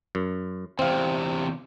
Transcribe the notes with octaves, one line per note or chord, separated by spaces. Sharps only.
F#2
E2 C3 C4 F5